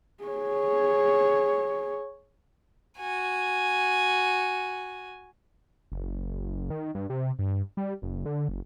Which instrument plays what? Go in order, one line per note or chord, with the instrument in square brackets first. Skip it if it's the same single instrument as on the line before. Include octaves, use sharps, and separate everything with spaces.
[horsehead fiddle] G#4 C#5
[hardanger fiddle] F#4 G#5
[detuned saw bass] F#1
D#3
G2
C3
G2
G3
F#1
D3
F#1